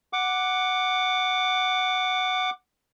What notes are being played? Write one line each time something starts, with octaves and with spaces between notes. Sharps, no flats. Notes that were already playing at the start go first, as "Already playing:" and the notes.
F#5 D6